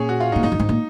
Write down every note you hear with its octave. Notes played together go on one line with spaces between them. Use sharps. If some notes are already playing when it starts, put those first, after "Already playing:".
Already playing: A#2 C#4 G#4
F#4
F4
D#4
A#2
G#2 D#4
F#2
G#2
A#2